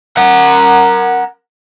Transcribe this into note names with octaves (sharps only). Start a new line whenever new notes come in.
A#4 F#5